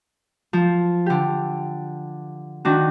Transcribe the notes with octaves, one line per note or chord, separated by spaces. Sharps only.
F3
D3 G4
D#3 D4 F#4